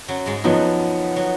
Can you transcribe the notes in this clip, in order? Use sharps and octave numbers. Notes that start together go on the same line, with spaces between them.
F#2 F#3
G#2 G#3
F#2 F3 F#3 B3 D#4
F#3